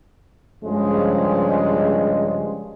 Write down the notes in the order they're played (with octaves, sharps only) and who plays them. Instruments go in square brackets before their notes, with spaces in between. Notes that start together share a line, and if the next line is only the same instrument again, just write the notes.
[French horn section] G2 C#3 F3 G#3